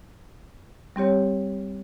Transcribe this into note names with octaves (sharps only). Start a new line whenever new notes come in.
G3 C4 G4 C#5